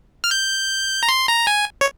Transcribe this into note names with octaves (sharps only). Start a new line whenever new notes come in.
F6
G6
A#5
C6
A#5
G#5
C#5